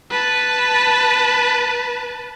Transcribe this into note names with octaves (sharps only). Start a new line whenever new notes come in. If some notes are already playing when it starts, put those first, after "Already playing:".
B4 A5